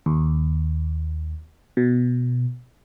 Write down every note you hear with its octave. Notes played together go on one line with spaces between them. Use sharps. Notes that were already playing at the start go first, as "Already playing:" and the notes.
D#2
B2